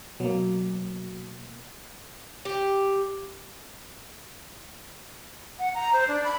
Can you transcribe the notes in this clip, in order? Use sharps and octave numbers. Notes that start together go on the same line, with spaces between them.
B2 F#3 A#3
G4
F#5
A#5
C5
D4
B5